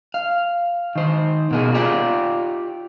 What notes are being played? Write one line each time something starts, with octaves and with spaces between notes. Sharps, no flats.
F5
D#3 C5
B2 A#3 G#4
F4 G4 D5